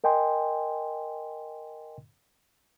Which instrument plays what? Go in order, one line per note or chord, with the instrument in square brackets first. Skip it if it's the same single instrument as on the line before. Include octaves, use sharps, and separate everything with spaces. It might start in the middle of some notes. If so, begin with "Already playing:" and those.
[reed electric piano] A#4 D#5 G5 G#5 C6